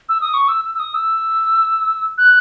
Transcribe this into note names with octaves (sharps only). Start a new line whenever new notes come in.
E6
D#6
C#6
E6
E6
E6
D#6
E6
F#6